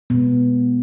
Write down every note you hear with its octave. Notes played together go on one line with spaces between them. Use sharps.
B2 G#3 B3